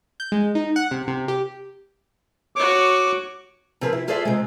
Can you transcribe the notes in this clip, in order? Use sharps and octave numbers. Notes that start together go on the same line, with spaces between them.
G6
G#3
D#4
F#5
C3
C3
G4
F#4 C#5 D6
C3 F3 C4 G#4 A#4 B4
E4
F4 G#4 A4 C5 D5 E5
C3 G#3